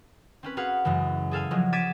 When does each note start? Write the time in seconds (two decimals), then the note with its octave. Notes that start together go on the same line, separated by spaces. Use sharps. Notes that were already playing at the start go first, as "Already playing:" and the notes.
0.43 C4 C#4 B4
0.57 F#4 G#4 B4 F5 F#5
0.85 F#2 C#3 E3 G#3
1.31 G#4 A4 F5 G#5
1.51 F3 F#3 G#3
1.73 D6 G#6 A6 B6 D#7 E7